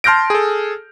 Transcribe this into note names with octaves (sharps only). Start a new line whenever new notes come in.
A5 C6 F6 G6 A#6 D7
G#4 A4